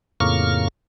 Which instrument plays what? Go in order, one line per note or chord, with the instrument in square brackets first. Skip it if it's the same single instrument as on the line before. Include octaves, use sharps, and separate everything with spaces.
[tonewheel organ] F2 A2 C#3 A#3 C#6 F6